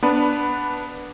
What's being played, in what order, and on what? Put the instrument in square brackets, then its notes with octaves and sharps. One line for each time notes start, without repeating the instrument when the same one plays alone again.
[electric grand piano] B3 D4 B4